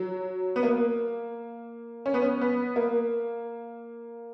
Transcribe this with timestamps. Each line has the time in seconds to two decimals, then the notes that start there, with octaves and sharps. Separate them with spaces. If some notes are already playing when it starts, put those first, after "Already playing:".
Already playing: F#3
0.56 B3
0.63 A#3
2.06 C#4
2.14 B3
2.22 C#4
2.41 B3
2.76 A#3